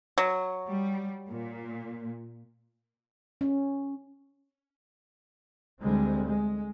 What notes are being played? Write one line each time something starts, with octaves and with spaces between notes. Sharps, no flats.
F#3
G3
A#2
C#4
D2 D3 G3 G#3 C4
G#3